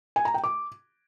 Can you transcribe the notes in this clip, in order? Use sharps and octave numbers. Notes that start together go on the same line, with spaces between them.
G#5
A#5
G5
D6